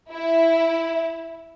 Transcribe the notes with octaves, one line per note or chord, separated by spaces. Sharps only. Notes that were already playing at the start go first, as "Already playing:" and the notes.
E4